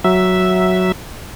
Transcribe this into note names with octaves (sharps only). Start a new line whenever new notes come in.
F#3 E5